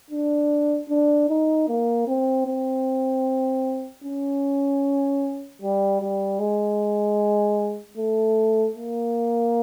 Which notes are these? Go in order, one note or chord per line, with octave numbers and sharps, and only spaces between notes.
D4
D4
D#4
A#3
C4
C4
C#4
G3
G3
G#3
A3
A#3